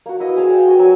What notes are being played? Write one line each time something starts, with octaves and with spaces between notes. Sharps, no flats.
A#3 F#4
E4 B4 D#5
F#4 G#4 F5 E6
D5 F5 G5
F#4 A#4 G#5
F#3